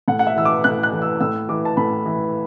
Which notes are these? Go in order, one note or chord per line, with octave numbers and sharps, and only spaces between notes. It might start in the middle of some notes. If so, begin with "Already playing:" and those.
A2 F#5
F#5
E5
E3 E6
D6
A2 F#6
F#6
E3
E6
A2 E6
E3 D6
A5
A2 B5
E3